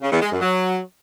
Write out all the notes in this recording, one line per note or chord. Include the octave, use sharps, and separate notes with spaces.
C#3
E2
G#3
F#2
F#3